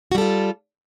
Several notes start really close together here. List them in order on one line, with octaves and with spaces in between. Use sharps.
F#4 G3 A4 F4